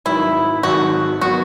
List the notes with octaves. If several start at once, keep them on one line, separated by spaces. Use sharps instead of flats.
G#1 G#2 D#3 F#3 E4
G#1 G#2 D#3 F#3 F#4
D#3 F#3 B3 F#4